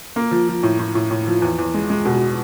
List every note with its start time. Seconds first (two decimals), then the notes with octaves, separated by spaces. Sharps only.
0.16 A#3
0.31 F3
0.48 F3
0.63 A2
0.79 A2
0.95 A2
1.11 A2
1.27 F3
1.42 E2
1.58 E2
1.74 G#3
1.90 G#3
2.05 B2